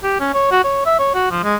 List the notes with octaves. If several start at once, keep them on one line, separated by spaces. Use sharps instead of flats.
G4
C#4
C#5
F#4
C#5
E5
C#5
F#4
F3
G#3